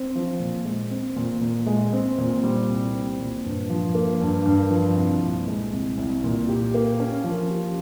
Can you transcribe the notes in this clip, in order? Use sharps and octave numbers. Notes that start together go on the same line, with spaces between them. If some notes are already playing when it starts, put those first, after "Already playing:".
Already playing: C4
F3
A#2
G#3
C4
A#2
A#2
G#3
C4
A#2
G3
C2
C4
A#2
G2
F3
A#3
G2
G2
F3
C2
A#2
G#3
C2
C2
A#2
G4
A#3
C#4
F3
G4